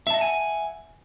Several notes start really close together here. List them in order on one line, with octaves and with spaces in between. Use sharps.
E5 A5 D#5 F#5 G#5